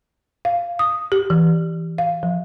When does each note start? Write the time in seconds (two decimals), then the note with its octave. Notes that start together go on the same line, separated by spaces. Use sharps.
0.45 F5
0.79 D#6
1.12 G4
1.30 E3
1.98 F5
2.23 F3